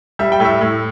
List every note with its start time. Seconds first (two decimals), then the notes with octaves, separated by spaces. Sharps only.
0.19 G3 E5
0.32 G5
0.40 A2 E5
0.61 A2